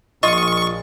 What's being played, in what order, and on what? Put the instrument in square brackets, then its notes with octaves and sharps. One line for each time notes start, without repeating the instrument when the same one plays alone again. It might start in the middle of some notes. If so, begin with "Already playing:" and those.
[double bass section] A#1 [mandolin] F4 D#6 [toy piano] D#5 [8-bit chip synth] C#6